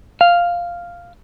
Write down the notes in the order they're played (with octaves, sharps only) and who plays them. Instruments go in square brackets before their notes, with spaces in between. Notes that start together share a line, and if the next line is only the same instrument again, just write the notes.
[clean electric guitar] F5